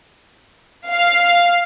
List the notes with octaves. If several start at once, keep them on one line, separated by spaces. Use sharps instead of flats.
F5